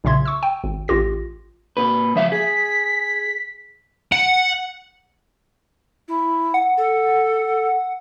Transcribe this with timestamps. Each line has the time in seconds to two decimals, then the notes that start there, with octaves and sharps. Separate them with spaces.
0.04 B1 A#2 C#3 E5 C6 G#6
0.25 C#6 E6
0.43 G5
0.64 G#1
0.88 A1 F4 G4 A#6
1.77 A#2 B4
2.16 F3 E5 F5
2.32 G#4 B6
4.12 F#5
6.08 E4
6.54 F#5
6.77 A4